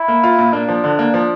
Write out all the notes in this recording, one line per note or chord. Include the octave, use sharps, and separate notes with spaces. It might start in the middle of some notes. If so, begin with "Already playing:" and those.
Already playing: E4
A#3
F4
A#2
A#3 D4
F3
D3
A#3
F3